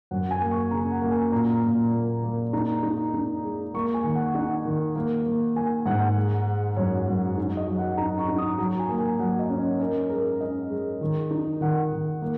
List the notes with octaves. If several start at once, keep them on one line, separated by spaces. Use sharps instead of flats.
F#2 F#5
G#5
A#3
C#6
C#3 A#5
F#5
A#3
G#5
A#2 A#5
A#2
A#3
A#3
D#4 A#5
D#4
D#4
G#3
A#3 C#6
G#5
D#3
F#5
D#4 F#5
D#3
A#3
A#3
A#3 G#5
G#2 F#5
G#3
G#3
F#2 C#5
F#2
D#4
D#5
F#3
F#5
D#4 A#5
C#6
D#4
D#6
F#3 A#5
G#5
A#3
G#5
F#3 F#5
D#5
C#4
C#5
C#4 A#4
G#3 A#4
C#4 D#5
G#3
D#3
D#4
D#3 F#5
D#3
A#3